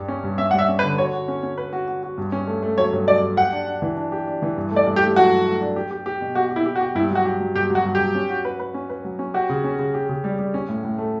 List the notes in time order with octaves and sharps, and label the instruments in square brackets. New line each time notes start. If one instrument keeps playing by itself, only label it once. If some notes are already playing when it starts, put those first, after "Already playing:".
Already playing: [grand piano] G2 G3
C#4
G2
[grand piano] C#4 [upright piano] E5
[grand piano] G3 [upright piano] F#5
[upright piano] E5
[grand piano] C#4
[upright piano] B4
[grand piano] D3
[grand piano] F#4 [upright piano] C#5
[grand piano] F#4
C#4
C#4
B4
F#4
F#4
F#4
G2
C#4
A3
A3
[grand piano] F#3 [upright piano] C#5
[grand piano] G2
[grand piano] F#3 [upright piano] D5
[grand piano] G2
[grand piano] G4 [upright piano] F#5
[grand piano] D4
D4
E3
D4
G4
D4
E3
G2
A3
[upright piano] D5
[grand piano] G2
[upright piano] G4
[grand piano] A3
[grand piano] F#3 [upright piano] F#4
[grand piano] G2
A3
D4
G4
G4
G4
B2
[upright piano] F#4 [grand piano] G4
[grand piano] G4
[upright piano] E4
[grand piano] G4
[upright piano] F#4
[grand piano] G4
[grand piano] G2 [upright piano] E4
[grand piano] F#3 [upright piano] F#4
[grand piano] G4
F#3
[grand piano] G2 [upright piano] G4
[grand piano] F#3
[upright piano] F#4
[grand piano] G2
[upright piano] G4
[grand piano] G2
C#4
F#4
B4
B4
C#4
B4
F#3
C#4
[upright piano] F#4 [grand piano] G4
[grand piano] C#3
C#4
C#3
G4
C#3
G3
G3
C#4
A2
A2
A3